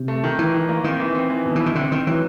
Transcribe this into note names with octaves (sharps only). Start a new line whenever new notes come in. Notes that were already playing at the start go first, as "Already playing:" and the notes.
Already playing: C3
A3
D#3
D#3 E3
D#3
A#3
D#3 C4
E3
C4
E3
B2
E3
E4
D#3
D3 C4
D#3 C4
E3 F#3